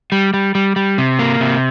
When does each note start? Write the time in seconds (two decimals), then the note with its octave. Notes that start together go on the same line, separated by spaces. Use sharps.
0.12 G3
0.34 G3
0.55 G3
0.76 G3
0.98 C3
1.19 A#3
1.40 C3